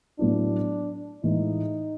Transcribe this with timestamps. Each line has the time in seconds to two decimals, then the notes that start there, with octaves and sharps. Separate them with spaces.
0.19 A2 F#3 B3 D4 E4
1.23 A2 E3 G#3 D#4